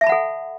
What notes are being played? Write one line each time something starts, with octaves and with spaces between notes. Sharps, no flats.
A4 E5 F#5 A5 B5